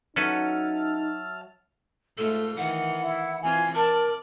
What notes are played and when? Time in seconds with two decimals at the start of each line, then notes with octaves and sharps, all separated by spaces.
0.16 F#3 C#4 D#4 A4 B4 E5 A5 F6
2.17 G#2 A3 F4 A4
2.57 D#3 E3 F#5
3.02 E4
3.43 E3 C4 F4 G#5
3.75 A#4 D5 A5